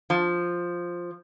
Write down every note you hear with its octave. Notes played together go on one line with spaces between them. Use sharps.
F3